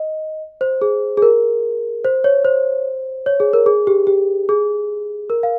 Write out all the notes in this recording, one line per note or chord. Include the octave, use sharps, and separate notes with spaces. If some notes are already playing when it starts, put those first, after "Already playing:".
Already playing: D#5
C5
G#4
G#4
A#4
C5
C#5
C5
C#5
G#4
A#4
G#4
G4
G4
G#4
A#4
F5